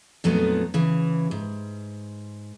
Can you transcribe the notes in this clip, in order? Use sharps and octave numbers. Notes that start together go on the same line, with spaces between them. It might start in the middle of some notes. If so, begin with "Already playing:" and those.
F2 A#2 F#3 A3 B3 D#4
C#3 E3
G#2